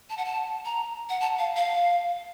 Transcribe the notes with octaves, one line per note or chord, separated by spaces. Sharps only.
A5
F#5
A5
A#5
F#5
A5
F5
F5